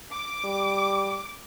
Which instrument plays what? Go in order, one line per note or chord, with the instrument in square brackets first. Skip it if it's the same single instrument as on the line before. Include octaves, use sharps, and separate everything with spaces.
[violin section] D6
[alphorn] G3